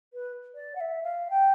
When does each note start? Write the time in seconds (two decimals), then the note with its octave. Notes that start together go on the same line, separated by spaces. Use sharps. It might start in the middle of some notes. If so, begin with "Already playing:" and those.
0.13 B4
0.55 D5
0.75 F#5
0.80 E5
1.03 F5
1.30 G5